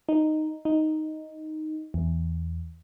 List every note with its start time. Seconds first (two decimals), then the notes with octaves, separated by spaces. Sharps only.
0.09 D#4
0.65 D#4
1.94 E2